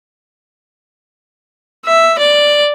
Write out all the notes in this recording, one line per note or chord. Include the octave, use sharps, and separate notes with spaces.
E5
D5